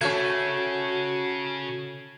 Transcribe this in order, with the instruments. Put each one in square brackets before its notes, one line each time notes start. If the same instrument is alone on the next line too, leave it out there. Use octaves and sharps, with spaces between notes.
[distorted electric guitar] C#3 [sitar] A3 C#4 [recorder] F#4 [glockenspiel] G#6